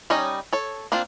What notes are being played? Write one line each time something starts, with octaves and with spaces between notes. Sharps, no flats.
G3 C#4 D#4 C#5 D#5
A4 C#5
A#3 C4 D4 F4